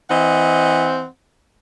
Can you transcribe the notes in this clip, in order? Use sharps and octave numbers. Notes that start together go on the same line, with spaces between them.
E3 C4 D#5 F#5